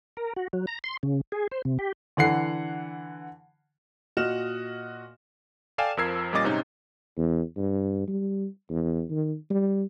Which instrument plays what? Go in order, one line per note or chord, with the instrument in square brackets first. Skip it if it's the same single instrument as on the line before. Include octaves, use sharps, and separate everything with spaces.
[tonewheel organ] A#4
F#4
F#3
A#5
C6
C#3
G#4
C5
C3
G4
[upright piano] D3 E3 F#5 C7
[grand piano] A#2 F#4 D#5 F6 E7
[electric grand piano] A4 D5 F5 G5 G#5 E7
F2 F3 A#4 E6 G#6 C7
A#2 G3 C#4 D#5 D6 A6
G#2 C3 C#4 D#4
[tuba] E2
G2
G3
E2
D#3
G3